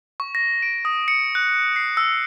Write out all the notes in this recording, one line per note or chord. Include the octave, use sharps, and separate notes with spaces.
C#6
A#6
D7
D#6
C#7
F#6
C7
E6